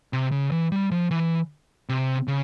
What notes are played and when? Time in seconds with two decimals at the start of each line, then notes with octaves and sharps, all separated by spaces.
0.13 C3
0.32 C#3
0.51 E3
0.72 G3
0.91 F3
1.11 E3
1.89 C3
2.28 C#3